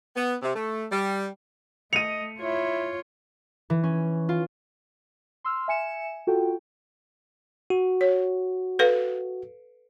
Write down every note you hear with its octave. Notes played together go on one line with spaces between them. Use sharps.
B3
C3
A3
G3
A3 D#5 C#7 D#7 F7
E4 F4 C#5
E3
C#4
F4
C6 E6 F6
E5 G#5 C#7 E7
F4 F#4 A4 G5
F#4
C#5
A4 B4 F5